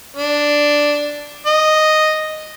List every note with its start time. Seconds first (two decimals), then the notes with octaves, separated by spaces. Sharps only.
0.17 D4
1.46 D#5